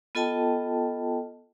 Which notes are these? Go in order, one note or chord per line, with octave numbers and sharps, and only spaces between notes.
B3 F4 A4 D#5 G5 A5